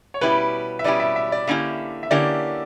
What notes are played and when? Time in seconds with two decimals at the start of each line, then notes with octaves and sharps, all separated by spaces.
0.14 C#5
0.21 B2 G3 C#4 E4 G4 B4
0.79 E5
0.84 B2 G3 C#4 E4 G4 D5
1.00 E5
1.16 E5
1.32 D5
1.47 D3 A#3 C#4 E4 G4 E5
2.03 E5
2.11 D3 A#3 C#4 E4 G4 D5